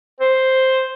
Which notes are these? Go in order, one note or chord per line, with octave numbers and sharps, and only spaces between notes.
C5